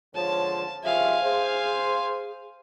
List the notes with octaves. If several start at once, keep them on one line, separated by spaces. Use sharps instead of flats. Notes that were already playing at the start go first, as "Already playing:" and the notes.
G#2 D3 F3 C#5 A5
C2 C#3 F3 E5 F5 G#5
G#4 C5